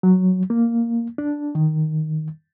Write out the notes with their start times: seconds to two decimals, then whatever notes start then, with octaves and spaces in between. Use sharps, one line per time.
0.03 F#3
0.50 A#3
1.18 D4
1.55 D#3